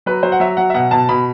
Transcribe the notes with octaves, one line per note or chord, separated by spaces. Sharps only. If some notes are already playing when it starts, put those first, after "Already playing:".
F#3 B4
F#3 C5
F#5
F#3 E5
F#3 F#5
E5
B2 F#5
B2 A5
B2 B5